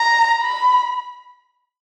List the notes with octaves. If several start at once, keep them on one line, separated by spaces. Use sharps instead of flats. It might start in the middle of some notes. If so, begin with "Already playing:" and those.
Already playing: A#5
B5